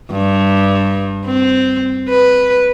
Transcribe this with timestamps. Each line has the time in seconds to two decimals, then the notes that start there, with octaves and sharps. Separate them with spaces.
0.11 G2
1.27 C4
2.09 B4